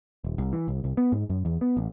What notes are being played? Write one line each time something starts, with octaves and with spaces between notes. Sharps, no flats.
D#1
C2
E3
C2
C2
B3
G#2
F#2
E2
B3
A1